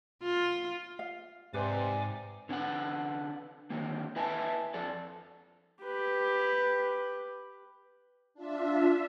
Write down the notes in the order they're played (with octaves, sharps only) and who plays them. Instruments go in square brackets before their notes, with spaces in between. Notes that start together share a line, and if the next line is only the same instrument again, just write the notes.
[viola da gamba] F4
[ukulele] F5
[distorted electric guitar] G#2 [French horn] C3 [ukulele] B4 C5 [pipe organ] D5 G#5 D6
[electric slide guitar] D3 C#4 B4 F#5
D3 D#3 F#3 A#3
E4 B4 D#5 E5 G#5 A5
F2 A4 D5
[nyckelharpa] G4 B4
[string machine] D4 F4 E5